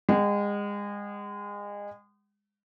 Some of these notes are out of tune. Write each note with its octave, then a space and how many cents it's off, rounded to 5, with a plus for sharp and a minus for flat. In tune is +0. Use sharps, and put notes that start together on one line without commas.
G#3 -30 F#5 +45